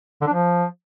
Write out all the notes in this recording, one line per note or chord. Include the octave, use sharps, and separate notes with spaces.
D3
D4
F3